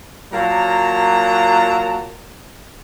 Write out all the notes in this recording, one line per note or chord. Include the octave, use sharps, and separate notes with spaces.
A#2 F#3 A#3 A5 A#5